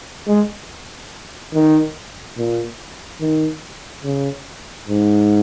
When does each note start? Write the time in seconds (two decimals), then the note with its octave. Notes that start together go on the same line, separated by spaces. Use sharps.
0.28 G#3
1.54 D#3
2.38 A#2
3.21 D#3
4.04 C#3
4.88 G#2